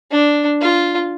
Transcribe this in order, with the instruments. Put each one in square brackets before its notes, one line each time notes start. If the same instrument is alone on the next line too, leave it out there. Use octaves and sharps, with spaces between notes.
[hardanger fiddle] D4
F4